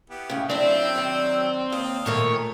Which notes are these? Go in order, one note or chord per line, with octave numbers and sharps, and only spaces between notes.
B3 E4 G4
A2 C#3
F#3 C4 D4 E4 G5 E6
D#3 D5
D#2 F5 D#6
A#2 D#3 A3 C#5